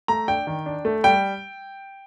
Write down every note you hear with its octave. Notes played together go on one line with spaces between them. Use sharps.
A3 A#5
D4 G5
D#3
D4
A3
G3 G5